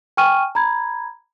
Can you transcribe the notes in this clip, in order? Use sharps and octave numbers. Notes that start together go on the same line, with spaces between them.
G5 G#5 C#6 F6 D#7
A#5 B5 G#6